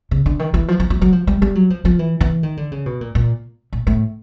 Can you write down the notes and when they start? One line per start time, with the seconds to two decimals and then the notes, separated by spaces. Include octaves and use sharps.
0.11 C#3
0.26 D3
0.39 D#3
0.54 E3
0.68 F3
0.80 F3
0.90 F#3
1.02 F#3
1.12 F3
1.27 G3
1.42 G3
1.55 F#3
1.70 F3
1.85 F3
1.99 E3
2.21 E3
2.43 D#3
2.57 D3
2.72 C#3
2.86 B2
3.01 A#2
3.15 A#2
3.73 A#2
3.87 A2